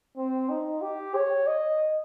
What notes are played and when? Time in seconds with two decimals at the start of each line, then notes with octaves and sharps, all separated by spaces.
0.17 C4
0.49 D#4
0.81 G4
1.15 C#5
1.47 D#5